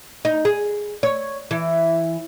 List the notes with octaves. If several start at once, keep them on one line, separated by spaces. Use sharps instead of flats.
D#4
G#4
C#5
E3